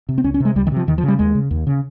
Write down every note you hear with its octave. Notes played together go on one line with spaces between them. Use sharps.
C3
C4
C#2 C#4
C#4
C3 G#3
C#2 G3
D#3
C3 F3
D#2 D#3
F3
C#3 G3
D#2 G#3
C#3
D#2
C#3